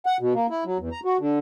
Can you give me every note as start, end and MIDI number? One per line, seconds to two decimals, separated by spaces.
0.06 0.17 78
0.20 0.33 47
0.34 0.47 58
0.50 0.64 64
0.65 0.78 54
0.79 0.89 40
0.92 1.00 82
1.05 1.17 66
1.19 1.39 50